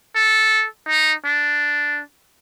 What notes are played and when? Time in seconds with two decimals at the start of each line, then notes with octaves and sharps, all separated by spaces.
0.15 A4
0.88 D#4
1.25 D4